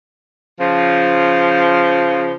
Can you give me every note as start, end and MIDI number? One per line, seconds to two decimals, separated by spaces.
0.59 2.32 49
0.59 2.32 53